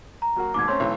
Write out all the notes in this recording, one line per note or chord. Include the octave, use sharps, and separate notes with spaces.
A#5
F#3 A#3 F#4
D#2 G#2 B2 D6 G#6
A3 C4 C#4 C#5 C6
B1 E3 A3